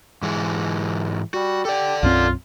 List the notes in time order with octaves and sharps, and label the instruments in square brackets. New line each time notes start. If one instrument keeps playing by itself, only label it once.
[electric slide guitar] G#2 E3 G#3
[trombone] G3 [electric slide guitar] F#4
[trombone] G4 [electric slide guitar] A4 D5
[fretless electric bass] B1 F#2 C4 [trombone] F4